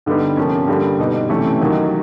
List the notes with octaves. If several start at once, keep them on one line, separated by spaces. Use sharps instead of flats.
G2 D3 G3 B3 D#4
C3 F3 A#3 C#4
G2 D3 G3 A#3
B2 G3 B3 D#4
C3 E3 A3 C#4
D#2 D#3 F#3 A#3 D#4